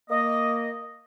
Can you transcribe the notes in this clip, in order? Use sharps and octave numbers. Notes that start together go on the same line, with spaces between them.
A#3 D#5